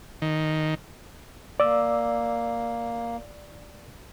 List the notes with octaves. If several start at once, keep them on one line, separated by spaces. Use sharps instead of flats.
D#3
A#3 D5 E6